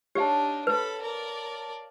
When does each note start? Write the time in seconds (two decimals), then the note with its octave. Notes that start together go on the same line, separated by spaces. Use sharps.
0.15 D4 D#4 G4 C#5 F5 A5
0.67 A4 B4 B5
1.01 A#4 D5